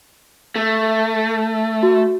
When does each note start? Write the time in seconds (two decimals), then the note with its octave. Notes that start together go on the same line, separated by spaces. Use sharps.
0.56 A3
1.83 F#4